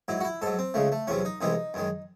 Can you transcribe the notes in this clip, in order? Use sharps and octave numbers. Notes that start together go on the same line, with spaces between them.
G#2 F#3 E4
F#4
E4
G#2 F#3 A4
C4
C#2 C#3 G#3 A3
A3
E2 C3 F#3 C#4
D#4
C2 C3 E3 G#3 D#4
F#2 D#3 G#3